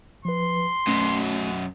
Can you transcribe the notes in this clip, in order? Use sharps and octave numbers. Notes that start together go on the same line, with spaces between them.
F3 B4 C6
F#2 B2 A3 C#4